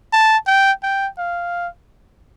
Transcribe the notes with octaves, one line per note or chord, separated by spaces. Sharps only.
A5
G5
G5
F5